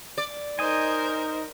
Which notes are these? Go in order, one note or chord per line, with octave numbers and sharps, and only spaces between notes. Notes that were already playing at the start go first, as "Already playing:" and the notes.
D5
D#4 A#4 C5 D#5 G#5